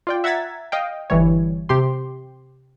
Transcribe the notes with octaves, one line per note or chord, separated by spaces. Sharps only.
F4 D5 G5
E5 F#5 A#5 G#6 A6 B6
D#5 F5 G5
G1 E3 G3 C#5
C3 G4 C6